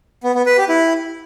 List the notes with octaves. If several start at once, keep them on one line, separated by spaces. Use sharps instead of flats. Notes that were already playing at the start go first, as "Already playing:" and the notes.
B3
B3
B4
G4
E4